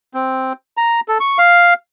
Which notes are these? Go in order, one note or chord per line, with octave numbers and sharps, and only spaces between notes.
C4
A#5
A4
C#6
F5